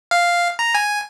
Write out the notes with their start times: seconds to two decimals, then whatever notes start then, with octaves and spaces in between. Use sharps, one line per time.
0.11 F5
0.59 A#5
0.74 G#5